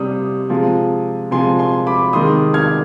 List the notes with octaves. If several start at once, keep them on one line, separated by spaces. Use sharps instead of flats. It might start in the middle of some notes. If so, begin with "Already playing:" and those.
Already playing: C3 G3 D#6
C3 F3 G#3
C3 F3 G#3 G#5 C6
G#5 C6
B5 D6
C3 D#3 G#3 C6 D#6
F6 G#6